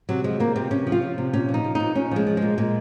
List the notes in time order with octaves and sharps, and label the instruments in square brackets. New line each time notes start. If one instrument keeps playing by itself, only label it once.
[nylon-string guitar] C3 F#3
F3 G#3
F3 A#3
C3 C4
C3 C#4
F3
F4
F3
C3
A#2 C#4
F3
D#4
F3
A#2 D#4
A#2 C#4
F3 G#3
F3
G#3
A#2
A#2 G#3